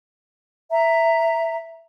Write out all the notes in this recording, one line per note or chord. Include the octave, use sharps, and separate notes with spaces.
E5 A#5